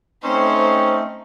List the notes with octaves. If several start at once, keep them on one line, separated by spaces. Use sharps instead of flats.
A3 C4 C#4 D#4 C5